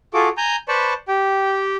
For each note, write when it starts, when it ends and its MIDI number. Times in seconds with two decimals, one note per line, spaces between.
0.14 0.29 65
0.14 0.29 66
0.14 0.29 68
0.14 0.29 69
0.14 0.29 86
0.37 0.56 80
0.37 0.56 82
0.37 0.56 91
0.68 0.94 71
0.68 0.94 72
0.68 0.94 74
0.68 0.94 81
0.68 0.94 83
0.68 0.94 85
1.08 1.77 67
1.08 1.77 79